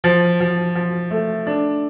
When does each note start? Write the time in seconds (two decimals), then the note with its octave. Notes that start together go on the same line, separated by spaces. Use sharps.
0.04 F3
0.40 F3
0.75 F3
1.11 A3
1.47 D4